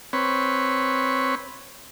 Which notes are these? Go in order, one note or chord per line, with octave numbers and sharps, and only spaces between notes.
C4 B4 C#5